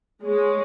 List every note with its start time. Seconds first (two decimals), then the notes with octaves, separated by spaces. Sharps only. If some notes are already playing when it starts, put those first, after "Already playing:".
0.24 G#3 C#5